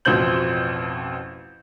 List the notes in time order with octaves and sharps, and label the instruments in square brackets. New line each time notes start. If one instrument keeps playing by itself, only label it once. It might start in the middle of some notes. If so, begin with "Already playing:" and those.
[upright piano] A1 F2 B2 C4 G6 F#7